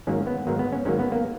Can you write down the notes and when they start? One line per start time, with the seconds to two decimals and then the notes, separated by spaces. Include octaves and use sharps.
0.07 G#2 D#3 F#3 A#3 C#4
0.27 B3
0.47 G#2 D#3 F#3 A#3
0.59 B3
0.73 C#4
0.85 G#2 D#3 F#3 A#3 C#4
0.99 B3
1.12 A#3